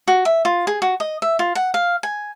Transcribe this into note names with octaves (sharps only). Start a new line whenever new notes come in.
F#4
E5
F4
G#4
F#4
D#5
E5
F4
F#5
F5
G#5